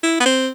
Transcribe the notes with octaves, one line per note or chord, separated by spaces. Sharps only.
E4
B3
C4